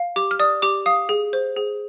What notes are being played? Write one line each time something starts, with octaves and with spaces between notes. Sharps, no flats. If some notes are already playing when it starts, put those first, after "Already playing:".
Already playing: F5
G4 D6
F6
D5 D#6
G4 D6
F5 D#6
G#4
C5
G#4